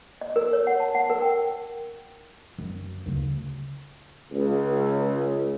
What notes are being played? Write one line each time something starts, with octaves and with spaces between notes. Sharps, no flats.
D#5
A#4
C#5
F#5
A5
F#5
A#4
G5
F#2 C#4
D2 C#3
C#2